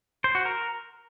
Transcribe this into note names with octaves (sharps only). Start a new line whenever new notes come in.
C5
F#4
A#4